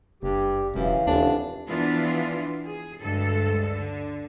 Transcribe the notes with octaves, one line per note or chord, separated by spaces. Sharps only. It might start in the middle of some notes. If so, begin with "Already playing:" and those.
F#1 G2 G4
E1 F#2 C#3 E3
F1 D#2 D4
E3 F3 B3 D4 F4
G#4
D2 G2 G#3 A4
D3